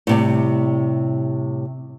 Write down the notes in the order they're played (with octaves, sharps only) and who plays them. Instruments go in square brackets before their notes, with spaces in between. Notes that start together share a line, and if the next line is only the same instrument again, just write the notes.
[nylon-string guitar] A2 C3 G3